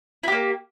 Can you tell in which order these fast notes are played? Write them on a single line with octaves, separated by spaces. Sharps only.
E4 G4 A#3